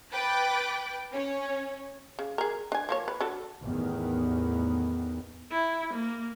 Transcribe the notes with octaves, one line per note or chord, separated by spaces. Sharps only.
B4 G5 D6 F#6 A6
C#4 C#5
C#3
G#4 A#4
D4 G#5
F3 A#3 C#5
B4
D4 F#4 A4
A1 E2 D#3 B3
E4
A#3